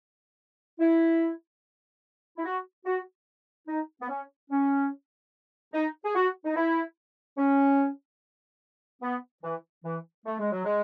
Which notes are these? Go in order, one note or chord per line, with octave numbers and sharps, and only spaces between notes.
E4
E4
F#4
F#4
D#4
B3
C#4
C#4
D#4
G#4
F#4
D#4
E4
C#4
B3
E3
E3
A3
G#3
F#3
G#3